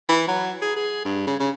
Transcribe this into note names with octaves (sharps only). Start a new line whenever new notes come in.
E3
F#3
G#4
G#4
G2
C#3
C#3